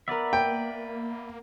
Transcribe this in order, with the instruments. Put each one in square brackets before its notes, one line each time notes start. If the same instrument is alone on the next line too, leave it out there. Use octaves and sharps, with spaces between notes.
[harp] B3 A#4 [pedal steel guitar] B4 D5 E5
[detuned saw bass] A#3 [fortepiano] G5